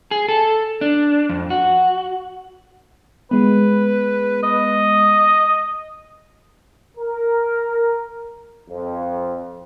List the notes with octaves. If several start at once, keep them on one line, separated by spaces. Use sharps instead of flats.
G#4
A4
D4
F2
F#4
G#3 B3 B4
D#5
A#4
F2